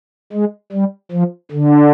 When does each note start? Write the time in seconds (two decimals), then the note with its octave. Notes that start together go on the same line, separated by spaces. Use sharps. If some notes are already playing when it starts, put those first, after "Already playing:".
0.33 G#3
0.72 G3
1.12 F3
1.51 D3